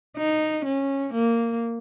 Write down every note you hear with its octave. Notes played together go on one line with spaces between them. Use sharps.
D#4
C#4
A#3